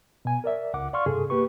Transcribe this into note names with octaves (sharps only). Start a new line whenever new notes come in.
B2 G#5
A#4 D5 E5
C#2 F#5 D6
D5 F5 C6 C#6 F6
G2 C3 G#4 A4
A#3 G4 B4 C#6